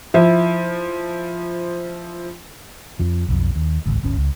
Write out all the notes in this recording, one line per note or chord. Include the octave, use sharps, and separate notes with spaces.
F3 E4
F2 F3
B1 F2
D#2
D1 G#1 C#2
D1 G1 C#4
C#2